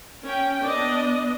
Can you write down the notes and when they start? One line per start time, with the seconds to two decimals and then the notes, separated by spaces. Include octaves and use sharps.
0.24 C#4 G5
0.63 B3 D4 D5 D#5